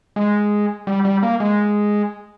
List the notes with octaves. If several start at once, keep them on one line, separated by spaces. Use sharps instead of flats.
G#3
G3
G3
A#3
G#3